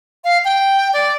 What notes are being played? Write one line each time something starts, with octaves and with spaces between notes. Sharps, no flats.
F5
G5
D5